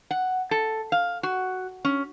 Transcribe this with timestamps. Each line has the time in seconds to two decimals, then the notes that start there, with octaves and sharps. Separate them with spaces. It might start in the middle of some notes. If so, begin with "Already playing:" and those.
0.11 F#5
0.51 A4
0.92 F5
1.23 F#4
1.85 C#4